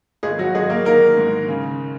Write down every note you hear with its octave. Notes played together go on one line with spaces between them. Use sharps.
G#1 G#3 G#4
F#3 F#4
G#1 G#3 G#4
A#3 A#4
D#3 A#3 A#4
G#2
C#3